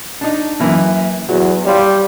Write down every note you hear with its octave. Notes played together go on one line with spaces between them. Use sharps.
D4 D#4
F#2 E3 A#3
E2 F#3
G3 C#5 F5 C6